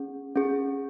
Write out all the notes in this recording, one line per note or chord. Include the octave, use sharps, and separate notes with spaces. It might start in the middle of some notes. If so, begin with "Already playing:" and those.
Already playing: C#4 G#4
C#4 G#4